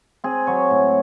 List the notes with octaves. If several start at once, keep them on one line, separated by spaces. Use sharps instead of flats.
C4 G#4
F#3 C#5
A2